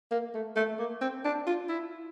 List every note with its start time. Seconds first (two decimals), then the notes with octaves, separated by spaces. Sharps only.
0.11 A#3
0.34 A3
0.56 A3
0.79 A#3
1.01 C4
1.24 D4
1.47 F4
1.69 E4